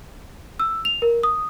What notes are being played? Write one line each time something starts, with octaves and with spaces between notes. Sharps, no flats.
E6
F7
A#4
D#6